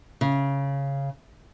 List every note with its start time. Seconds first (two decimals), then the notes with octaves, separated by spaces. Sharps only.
0.21 C#3